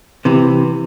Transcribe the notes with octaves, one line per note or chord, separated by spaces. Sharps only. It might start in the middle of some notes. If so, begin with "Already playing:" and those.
C3 E3